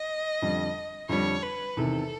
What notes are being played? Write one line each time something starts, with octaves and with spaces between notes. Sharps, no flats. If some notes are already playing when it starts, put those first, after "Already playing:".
Already playing: D#5
F2 D3 G3
F2 D3 G3 C#5
B4
E2 C3 D#3 A4